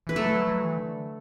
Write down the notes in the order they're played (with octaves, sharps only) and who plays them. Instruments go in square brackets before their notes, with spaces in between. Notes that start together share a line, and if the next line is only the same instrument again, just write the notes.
[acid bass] E3 [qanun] B4
[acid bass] F#3 [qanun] A3 A4
[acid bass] F#3
F#3
E3
D3